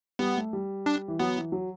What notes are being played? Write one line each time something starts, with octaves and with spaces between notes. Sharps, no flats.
G3 B3
A3
G3
D4
E3
F#3 B3
E3
F#3